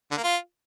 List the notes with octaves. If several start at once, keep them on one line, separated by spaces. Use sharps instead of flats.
D3
A#3
F4